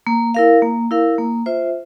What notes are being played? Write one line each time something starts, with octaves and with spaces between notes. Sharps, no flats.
A#3
E4 A#4 F5
A#3
E4 A#4 F5
A#3
F4 C5 E5